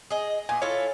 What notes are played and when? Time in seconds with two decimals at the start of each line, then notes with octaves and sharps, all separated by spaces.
0.10 G#4 D#5
0.49 A#2 B3 G#5
0.62 E4 F4 A4 C#5